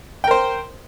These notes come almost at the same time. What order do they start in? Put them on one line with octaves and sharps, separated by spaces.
G5 A#4 C5